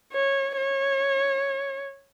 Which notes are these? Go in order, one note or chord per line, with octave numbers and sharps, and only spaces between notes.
C#5
C#5